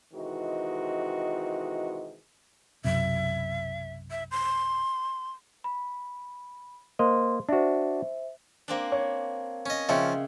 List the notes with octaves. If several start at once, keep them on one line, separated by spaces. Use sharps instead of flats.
C3 D#3 E3 G#3 F#4 D#5
B1 F#2 C3 E5
E5
C6
B5
A#3 C5 D#5 C6
D4 F#4 C5 E5
A#3 C4 D4
C#5
C#4 D#5
C#3 F3 C#4 D#5 E5 G5